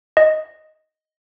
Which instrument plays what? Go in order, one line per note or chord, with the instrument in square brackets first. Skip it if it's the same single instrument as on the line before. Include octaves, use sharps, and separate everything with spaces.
[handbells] D#5